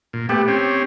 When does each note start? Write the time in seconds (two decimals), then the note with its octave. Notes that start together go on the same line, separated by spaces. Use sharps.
0.13 A#2
0.29 A3 B3 G4 D6
0.48 C4 C#4